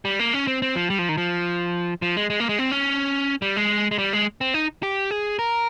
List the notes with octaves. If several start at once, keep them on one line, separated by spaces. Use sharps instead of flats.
G3
A#3
C#4
C4
C4
F3
G3
F3
D#3
F3
F3
G#3
G#3
A#3
G#3
C4
C#4
G3
G#3
G#3
G3
G#3
C4
D#4
G4
G#4
A#4